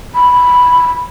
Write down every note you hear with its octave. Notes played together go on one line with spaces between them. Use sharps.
B5